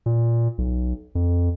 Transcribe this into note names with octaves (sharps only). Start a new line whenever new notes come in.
A#2
B1
F2